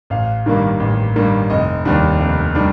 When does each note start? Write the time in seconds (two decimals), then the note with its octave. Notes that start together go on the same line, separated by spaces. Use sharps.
0.10 A1 F5
0.46 G2 D#3 G3 A#3
0.80 A1
1.16 G2 D#3 G3 A#3
1.50 F1 D#5
1.85 D#2 D#3 G3 D4
2.20 F1
2.55 D#3 G3 D4